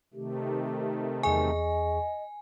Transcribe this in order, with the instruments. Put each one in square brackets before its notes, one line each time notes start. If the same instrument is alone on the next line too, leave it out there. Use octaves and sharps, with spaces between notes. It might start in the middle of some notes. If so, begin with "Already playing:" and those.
[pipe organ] C3 D#3 A3 [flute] G4
[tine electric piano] E2 G#4 C#6 [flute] D#5 [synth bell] G#5